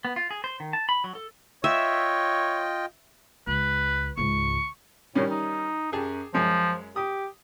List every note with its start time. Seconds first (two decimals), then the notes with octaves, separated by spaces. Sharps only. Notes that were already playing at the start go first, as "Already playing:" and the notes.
0.05 B3
0.16 F4
0.31 G#4
0.44 C5
0.60 D#3
0.73 A5
0.89 B5
1.04 F#3
1.15 A4
1.64 F4 C#5 D#5 E5 G5
3.47 C#2 B4
4.17 C#2 G#2 C#6
5.15 A2 D#3 G3 C#4
5.31 D#4
5.92 F#2 G4 G#4 A5
6.34 F#2 F3 G#3
6.96 G4 D#6